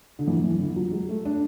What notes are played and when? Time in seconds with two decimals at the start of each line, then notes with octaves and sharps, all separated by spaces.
0.19 D3
0.27 E3
0.44 E3
0.61 D3
0.76 F#3
0.93 G#3
1.09 A3
1.25 D4